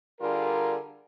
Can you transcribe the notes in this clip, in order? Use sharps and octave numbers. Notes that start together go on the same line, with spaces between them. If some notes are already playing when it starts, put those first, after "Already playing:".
D3 G3 F4 G#4 A#4